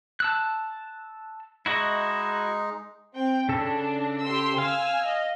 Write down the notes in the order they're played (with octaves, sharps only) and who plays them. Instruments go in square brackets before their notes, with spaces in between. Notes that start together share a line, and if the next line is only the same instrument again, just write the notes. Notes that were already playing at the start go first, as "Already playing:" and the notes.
[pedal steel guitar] A5 E6 F#6
[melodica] G#3 D#4 [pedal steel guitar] E4 F#4 D#5
[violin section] C4 G5
[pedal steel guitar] C#3 A4 [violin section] D4
[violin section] G4 C6 E6
[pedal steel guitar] F5 [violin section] G#5 E6 F6
[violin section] D#5